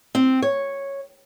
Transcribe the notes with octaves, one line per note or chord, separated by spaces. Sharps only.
C4
C#5